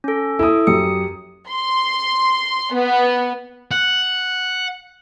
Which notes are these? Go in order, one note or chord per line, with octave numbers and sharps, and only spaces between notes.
C#4 A4
E4 A4 D#6
F#2 G4 D#6 C#7
C6
B3
F#5